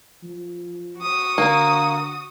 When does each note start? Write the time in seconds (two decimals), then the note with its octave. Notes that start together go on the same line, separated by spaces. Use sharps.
0.23 F3
0.99 F#4 D#6
1.38 D3 A#3